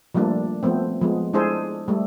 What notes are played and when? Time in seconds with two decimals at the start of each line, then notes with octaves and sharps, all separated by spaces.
0.15 F3 G3 A3 A#3 D4
0.63 F3 A3 B3 C4
1.01 F3 G#3 B3
1.33 G#3 D4 E4 G#4 A4 C5
1.88 G3 A3